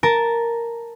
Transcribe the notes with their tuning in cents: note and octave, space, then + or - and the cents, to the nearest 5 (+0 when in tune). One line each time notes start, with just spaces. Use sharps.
A#4 +0 A5 +0